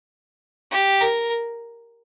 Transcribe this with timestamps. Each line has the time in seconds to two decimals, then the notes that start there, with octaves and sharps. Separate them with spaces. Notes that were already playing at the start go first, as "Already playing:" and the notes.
0.71 G4
1.01 A#4